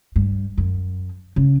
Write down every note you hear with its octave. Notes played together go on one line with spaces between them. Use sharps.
G2
F#2
C#3